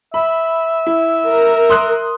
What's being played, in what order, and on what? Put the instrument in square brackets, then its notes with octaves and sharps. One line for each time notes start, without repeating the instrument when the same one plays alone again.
[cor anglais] E5 [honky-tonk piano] B5
[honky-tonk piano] E4
[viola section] A#4
[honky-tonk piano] C6 D#6 F#6